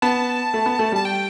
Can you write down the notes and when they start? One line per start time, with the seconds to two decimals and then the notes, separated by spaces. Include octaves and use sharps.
0.02 B3 A5
0.54 A3
0.66 B3
0.79 A3
0.92 G3 A5
1.05 G5